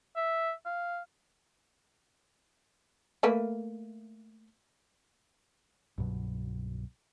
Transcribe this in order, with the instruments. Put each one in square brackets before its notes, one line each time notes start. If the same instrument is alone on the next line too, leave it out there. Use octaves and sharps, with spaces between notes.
[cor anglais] E5
F5
[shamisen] A3 A#3 B4
[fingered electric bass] C2 G2 B2 F#3